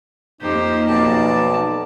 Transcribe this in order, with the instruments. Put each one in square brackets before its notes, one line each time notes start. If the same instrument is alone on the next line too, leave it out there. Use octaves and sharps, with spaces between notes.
[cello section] F2 A#3 [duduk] D#4 [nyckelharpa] G4 C5
[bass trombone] B1 [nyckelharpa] D5 A5